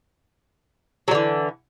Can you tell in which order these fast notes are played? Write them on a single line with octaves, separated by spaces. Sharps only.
F#3 D3 E3